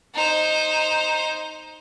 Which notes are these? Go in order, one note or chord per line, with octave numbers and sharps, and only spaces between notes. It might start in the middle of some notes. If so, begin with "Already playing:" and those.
D#4 C5